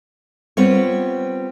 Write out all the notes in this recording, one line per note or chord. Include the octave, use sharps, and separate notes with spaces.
G3 B3 C4 F4 C#5